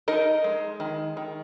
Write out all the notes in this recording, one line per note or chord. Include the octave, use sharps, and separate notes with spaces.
D#4 A#4 D#5
G#3
D#3
D#3